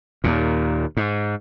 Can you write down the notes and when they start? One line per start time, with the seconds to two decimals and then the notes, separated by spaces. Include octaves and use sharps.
0.24 D#2 A#2
0.97 G#2